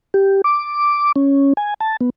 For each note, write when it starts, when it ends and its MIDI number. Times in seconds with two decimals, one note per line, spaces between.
0.14 0.41 67
0.44 1.12 86
1.16 1.53 61
1.57 1.74 80
1.80 1.97 81
2.01 2.10 59